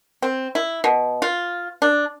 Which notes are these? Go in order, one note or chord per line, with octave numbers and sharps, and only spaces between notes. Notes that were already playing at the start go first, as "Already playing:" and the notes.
C4
E4
B2
F4
D4